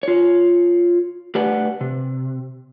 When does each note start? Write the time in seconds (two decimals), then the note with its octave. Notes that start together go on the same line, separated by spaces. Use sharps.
0.03 F4 C#5
1.35 A3 G4 B4 D5 F#5
1.81 C3